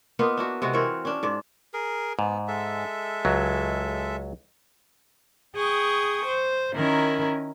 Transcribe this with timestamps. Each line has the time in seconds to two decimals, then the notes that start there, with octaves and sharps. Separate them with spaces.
0.19 A#3 B3 D#4 F4
0.37 D4 E4 F#4
0.62 C3 G#3 F#4
0.73 E3 C4 A#4 C#5
1.05 C#4 D4
1.23 G#2 D5
1.74 G#4 A#4
2.19 G#2 B3
2.48 G#3 A4 E5
3.25 C#2 F#3
5.55 G#4 G5 C#6 D#6
6.26 C5
6.75 D#3 C#4 E4 A#4